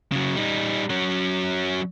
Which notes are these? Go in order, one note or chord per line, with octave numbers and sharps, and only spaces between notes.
C#3 F#3
G3 D#4
F#3 C#4